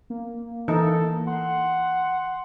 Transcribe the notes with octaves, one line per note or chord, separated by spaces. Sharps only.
A#3
E3 D#4 A4
F#5 C6